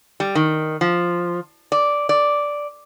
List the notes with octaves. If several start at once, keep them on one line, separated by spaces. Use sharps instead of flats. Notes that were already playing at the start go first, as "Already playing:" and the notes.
G3
D#3
F3
D5
D5